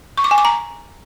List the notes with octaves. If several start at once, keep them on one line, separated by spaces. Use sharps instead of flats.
C#6
D6
G#5
D6
A#5